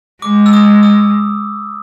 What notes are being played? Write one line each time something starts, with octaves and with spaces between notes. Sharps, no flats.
G#3 D6
E6
D#6
D#6